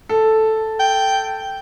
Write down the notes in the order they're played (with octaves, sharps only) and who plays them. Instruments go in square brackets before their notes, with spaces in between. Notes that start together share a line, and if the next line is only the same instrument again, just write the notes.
[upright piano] A4
[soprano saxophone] G5